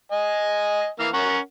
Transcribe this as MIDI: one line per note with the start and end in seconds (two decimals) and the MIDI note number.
0.12 0.87 75
0.12 0.87 80
1.00 1.09 52
1.00 1.09 58
1.00 1.09 89
1.14 1.38 61
1.14 1.38 70
1.14 1.38 78